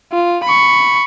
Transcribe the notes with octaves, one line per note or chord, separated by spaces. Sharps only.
F4
B5 C#6